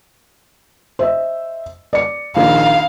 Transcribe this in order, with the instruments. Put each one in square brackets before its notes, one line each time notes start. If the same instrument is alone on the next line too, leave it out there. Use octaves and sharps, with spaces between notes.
[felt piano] C5 D#5 E5
D5 C#7
[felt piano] A#1 D#3 [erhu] F5